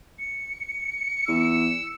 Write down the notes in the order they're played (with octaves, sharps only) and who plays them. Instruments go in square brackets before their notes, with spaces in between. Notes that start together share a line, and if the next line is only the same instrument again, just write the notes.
[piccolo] C#7
[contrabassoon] E2 [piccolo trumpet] E6